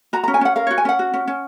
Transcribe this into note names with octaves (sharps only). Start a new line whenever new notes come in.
F#4 A#5
C#4 A#5
G#5
C#4 F#5
A#4 F5
F#4 C#5
G#5
C#4 F#5
F#4
C#4
C#4